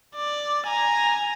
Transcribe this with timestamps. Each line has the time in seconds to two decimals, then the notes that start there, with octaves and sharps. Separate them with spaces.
0.16 D5
0.67 G#5 A#5